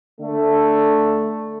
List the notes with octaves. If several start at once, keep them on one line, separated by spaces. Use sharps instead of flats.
D3 A3